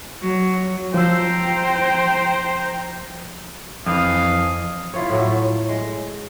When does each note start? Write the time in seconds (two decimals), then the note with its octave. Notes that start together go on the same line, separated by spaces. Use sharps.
0.21 F#3
0.94 F3 C5 G5 A#5 E6
3.86 F2 E3 F5 D#6
4.94 E4 F4 C#5
5.10 A2 F#3 A3
5.69 G#3